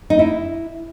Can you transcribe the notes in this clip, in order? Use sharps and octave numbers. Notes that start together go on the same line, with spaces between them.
D#4
E4